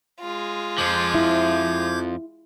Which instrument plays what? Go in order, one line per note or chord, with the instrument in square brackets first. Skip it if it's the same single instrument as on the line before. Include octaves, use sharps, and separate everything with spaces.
[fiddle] G#3 F4
[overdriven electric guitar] F2 F3 [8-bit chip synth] D6 G6 G#6
[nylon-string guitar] E4